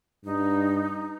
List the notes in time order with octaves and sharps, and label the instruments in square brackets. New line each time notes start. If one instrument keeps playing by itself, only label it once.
[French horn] G2 [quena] D#4